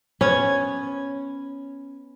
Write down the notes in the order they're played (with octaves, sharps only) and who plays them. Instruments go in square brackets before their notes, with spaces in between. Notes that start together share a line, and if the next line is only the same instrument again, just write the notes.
[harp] B3 G#6 [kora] C#4